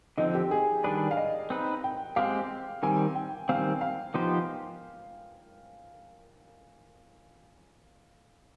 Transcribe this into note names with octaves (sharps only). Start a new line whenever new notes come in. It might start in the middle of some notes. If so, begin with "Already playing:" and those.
D3 F3 C4 D#4
G4
G#4
D#3 G3 D4 G#4 B4 D5
F5
D#5
C4 D#4 B4
G5
G#3 C4 G4 F5
D#3 G3 C4 G#5
G5
D#3 G3 C4 F5
F5
F3 B3 D#4 G4 C5